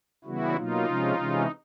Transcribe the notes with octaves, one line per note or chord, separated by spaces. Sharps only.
C#3 E3 G3 B3 E4 F#4
B2 F#3 A#3 D#4 F4
C3 F3 G#3 C#4
C3 E3 G#3 C#4